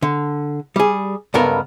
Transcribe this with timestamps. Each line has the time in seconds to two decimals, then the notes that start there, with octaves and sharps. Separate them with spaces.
0.02 D3
0.76 G3 G#4
1.34 C#2 G2 B3 A4 A#4